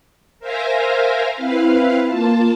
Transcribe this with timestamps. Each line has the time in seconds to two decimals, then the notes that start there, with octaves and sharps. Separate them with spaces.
0.40 A#4 C5 E5 F5 G#5 A#5
1.35 C4 E4 B4 F5
2.06 A#3 F4 A5